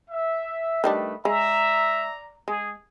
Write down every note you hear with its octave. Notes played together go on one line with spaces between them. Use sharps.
E5
D#3 G3 A3 D4 B4 D#5
G#3 D5 E5 A#5
G#3 G#4